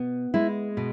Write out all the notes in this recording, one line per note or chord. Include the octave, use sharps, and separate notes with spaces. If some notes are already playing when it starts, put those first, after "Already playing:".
Already playing: B2 B3
G#3 E4
B2